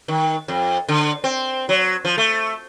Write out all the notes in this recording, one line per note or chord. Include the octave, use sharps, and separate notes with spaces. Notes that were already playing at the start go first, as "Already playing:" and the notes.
D#3
F2
D3
C4
F#3
F3
A3